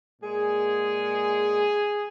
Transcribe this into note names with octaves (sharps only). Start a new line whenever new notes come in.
A#2 G#3 G#4